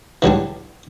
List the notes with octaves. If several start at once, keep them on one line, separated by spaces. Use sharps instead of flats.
E3 F#3 G3 D4